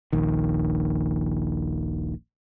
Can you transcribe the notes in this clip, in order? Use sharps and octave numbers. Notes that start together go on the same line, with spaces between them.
D#1 A#1 D#3